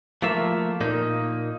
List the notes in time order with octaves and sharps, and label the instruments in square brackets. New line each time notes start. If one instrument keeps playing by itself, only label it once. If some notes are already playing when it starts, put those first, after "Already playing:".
[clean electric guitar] F3 A3 A#3 F4 E5
A#2 A#3 D#4